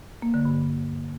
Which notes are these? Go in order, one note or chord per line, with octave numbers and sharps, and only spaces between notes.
A#3
D3
G2